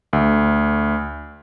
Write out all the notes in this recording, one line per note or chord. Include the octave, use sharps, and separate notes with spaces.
D2